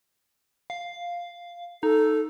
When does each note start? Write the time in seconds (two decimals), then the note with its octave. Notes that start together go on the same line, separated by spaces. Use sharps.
0.70 F5
1.83 D#4 A4